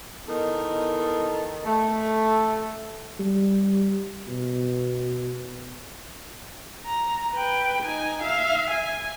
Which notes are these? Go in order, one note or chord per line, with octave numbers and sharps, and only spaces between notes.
E2 D#3 D#4 A4 A#4
A3
G3
B2
A#5
B4 G5
D#4 G#5
E5 F5
G#5